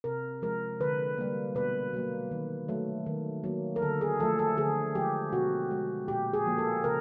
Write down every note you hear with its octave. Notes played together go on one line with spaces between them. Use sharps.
C3 A#4
F3 G#3 A#4
D3 B4
G3 A#3
B2 B4
F#3 A#3
D#3
F#3 A3
D#3
F#3 A#3
A#4
D3 A4
G#4
F3 A3 A4
A4
D3 G#4
F3 G#3 G4
B2 F#4
G#3
A#2 G4
G#4
F3 A#3
A4
C#3 A#4